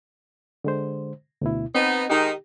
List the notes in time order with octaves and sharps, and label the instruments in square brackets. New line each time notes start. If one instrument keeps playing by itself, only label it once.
[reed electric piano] D3 G#3 C5
D2 B2 E4
[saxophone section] B3 D#4 [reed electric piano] C4
[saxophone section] D#3 G#3 D#4 [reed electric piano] G4